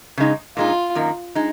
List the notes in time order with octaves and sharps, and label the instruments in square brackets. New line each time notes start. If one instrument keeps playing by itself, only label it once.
[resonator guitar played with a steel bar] C#3 G#3 D#4
[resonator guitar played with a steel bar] A#2 G#3 D#4 [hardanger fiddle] F4
[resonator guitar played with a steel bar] F#2 D#3 A#3
G#3 D#4